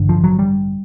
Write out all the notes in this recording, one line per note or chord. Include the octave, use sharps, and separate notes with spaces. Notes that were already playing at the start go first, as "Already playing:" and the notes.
Already playing: A1 G2 D3
F3
F#3
G3